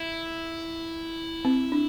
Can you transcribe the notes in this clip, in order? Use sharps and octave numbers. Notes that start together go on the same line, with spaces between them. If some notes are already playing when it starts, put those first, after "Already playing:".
Already playing: E4
C4
D4